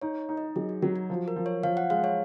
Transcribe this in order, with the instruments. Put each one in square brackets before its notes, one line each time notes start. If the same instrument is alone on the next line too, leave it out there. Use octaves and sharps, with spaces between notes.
[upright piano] D#4 [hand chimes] C#5
[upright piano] D#4
[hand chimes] D#5
[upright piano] F#3 [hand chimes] G#4
[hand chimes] F#4
[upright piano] F#3 [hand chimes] F#4
[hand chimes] F#4
[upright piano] F3
[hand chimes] A#4
[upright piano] F3
[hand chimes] C#5
[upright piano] F3 [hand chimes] F5
[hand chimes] F#5
[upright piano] G#3 [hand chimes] F5
[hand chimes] C#5